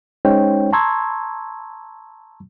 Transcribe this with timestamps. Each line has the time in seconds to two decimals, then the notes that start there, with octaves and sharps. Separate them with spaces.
0.25 G#3 C#4 D#4 C5 C#5 G5
0.73 A5 A#5 C6 C#6 E6 G#6